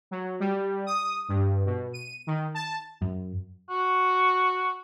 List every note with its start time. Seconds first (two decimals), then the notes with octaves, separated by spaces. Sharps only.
0.11 F#3
0.40 G3
0.86 D#6
1.29 G2
1.66 B2
1.93 D#7
2.27 D#3
2.54 A5
3.02 F#2
3.70 F#4